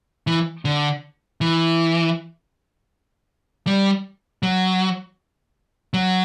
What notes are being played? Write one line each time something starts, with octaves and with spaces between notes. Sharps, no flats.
E3
D3
E3
G3
F#3
F#3